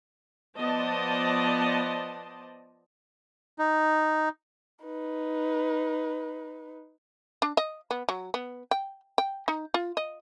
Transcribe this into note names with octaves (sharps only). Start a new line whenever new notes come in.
F3 B3 C5 D5 D#5 A5
D#4
D#4 B4
D4
D#5
B3
F#3
B3
G5
G5
D#4
F4
D#5